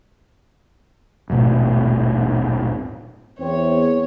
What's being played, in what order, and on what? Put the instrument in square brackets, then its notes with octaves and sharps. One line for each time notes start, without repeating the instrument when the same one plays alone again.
[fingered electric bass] D#1 G#1 B2 A3
[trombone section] E2 C4 [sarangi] C#5